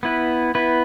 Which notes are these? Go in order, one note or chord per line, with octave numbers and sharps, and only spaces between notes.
B3 E4 B4
B3 E4 B4